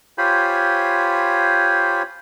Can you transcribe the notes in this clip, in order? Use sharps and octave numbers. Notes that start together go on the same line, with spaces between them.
F4 G4 C5 C#5 G#5 B5